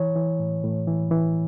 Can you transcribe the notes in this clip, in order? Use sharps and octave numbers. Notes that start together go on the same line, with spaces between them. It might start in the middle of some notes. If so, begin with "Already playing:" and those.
Already playing: E3 C#5
E3
A2
A2
E3
E3